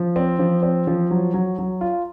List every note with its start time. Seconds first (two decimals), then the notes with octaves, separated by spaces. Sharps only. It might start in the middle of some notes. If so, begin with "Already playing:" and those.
Already playing: F3
0.16 C4
0.39 F3
0.63 C4
0.87 F3
1.11 F#3
1.34 F#3
1.58 F#3
1.81 F4